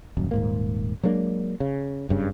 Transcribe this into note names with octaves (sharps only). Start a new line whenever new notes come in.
D#1 F#2
D#1 G#2 A#3
F#3 G#3 A#3 D4
C#3
F#1 G2 C#3